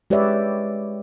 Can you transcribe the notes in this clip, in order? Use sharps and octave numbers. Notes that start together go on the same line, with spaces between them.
G#3 G4 B4 C#5 D5 E5